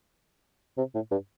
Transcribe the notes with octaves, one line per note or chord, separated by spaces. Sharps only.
C3
A2
G2